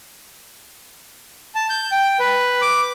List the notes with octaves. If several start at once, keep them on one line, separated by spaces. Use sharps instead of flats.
A5
G6
G5
B4
D6